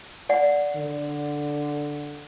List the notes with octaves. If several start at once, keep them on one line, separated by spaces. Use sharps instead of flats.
D5 F#5
D3